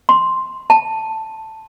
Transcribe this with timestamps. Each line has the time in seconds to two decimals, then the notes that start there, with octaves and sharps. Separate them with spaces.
0.09 C6
0.70 A5